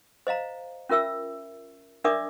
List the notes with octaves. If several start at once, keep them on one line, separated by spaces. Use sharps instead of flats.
C5 D#5 F5 A#5
C#4 F4 A#4 E5 E6
D4 A#4 D5 E5 D6 D#6